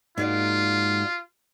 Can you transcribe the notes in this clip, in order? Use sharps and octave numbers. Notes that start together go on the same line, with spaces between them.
G#2 G#3 A#3 D#4 F4 F#4 D5